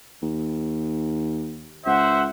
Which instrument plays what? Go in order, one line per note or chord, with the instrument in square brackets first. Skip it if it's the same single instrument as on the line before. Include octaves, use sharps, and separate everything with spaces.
[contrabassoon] D#2
[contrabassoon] C#2 [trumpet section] C5 E5 F#5